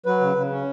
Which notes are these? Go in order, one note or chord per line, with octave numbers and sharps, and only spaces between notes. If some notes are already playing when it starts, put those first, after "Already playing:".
F#3 B4
C#3
C#3
C#4